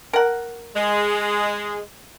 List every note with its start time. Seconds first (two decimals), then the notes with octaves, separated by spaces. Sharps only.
0.13 A#4 F#5
0.75 G#3